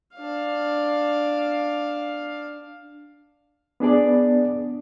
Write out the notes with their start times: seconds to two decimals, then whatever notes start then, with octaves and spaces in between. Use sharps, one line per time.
0.16 D4 F5
3.80 B3 D4 G#4 D5